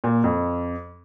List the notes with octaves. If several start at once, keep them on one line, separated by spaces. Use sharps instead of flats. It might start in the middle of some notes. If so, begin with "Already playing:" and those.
A#2
F2